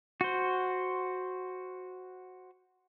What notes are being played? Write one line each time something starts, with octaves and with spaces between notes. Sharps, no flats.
F#4 C5